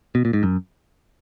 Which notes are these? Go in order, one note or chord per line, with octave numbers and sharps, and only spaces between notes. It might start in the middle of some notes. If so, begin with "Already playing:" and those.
B2
A#2
G#2
F#2